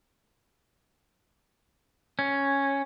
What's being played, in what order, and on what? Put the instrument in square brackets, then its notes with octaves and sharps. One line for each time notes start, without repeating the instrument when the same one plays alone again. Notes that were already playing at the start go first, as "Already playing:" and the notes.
[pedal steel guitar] C#4